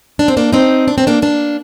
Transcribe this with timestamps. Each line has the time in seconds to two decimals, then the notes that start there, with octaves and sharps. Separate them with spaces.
0.19 D4
0.28 C4
0.37 A#3 D4
0.53 C4 D#4
0.88 D4
0.98 C4
1.07 A#3 D4
1.22 A#3 D4